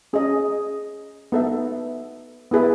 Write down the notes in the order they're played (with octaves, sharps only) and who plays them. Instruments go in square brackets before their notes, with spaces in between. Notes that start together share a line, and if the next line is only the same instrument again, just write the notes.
[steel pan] C#4 G#4 D#5
B3 D#4 A4 E5
B3 E4 G#4 B4 E5